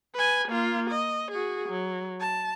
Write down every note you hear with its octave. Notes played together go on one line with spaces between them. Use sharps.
B4 G#5
A#3 F4
D#5
F#4 G#4
F#3
A5